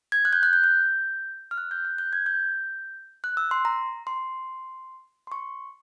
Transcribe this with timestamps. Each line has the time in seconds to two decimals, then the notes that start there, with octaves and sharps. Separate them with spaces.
0.12 G#6
0.25 F#6
0.33 G6
0.43 F#6
0.53 G6
0.64 G6
1.51 F6
1.58 F#6
1.71 G6
1.85 F#6
1.98 G6
2.13 G#6
2.26 G6
3.24 F#6
3.37 E6
3.51 C6
3.65 A#5
4.07 C6
5.27 C6
5.32 C#6